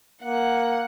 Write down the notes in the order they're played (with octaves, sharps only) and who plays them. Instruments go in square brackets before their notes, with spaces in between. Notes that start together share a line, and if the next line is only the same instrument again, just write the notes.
[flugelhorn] A#3 [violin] F#5